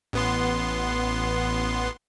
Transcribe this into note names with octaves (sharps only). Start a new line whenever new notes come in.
A1 B3 C6